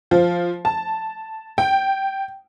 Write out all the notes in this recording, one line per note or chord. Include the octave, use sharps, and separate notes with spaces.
F3
A5
G5